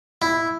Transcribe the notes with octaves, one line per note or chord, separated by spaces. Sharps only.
E4